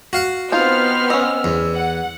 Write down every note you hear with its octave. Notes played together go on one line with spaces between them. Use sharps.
F#4 F5 F#5
B3 C4 D#4 F4 C5 F6
C#4 D#5 E6
E2
F#5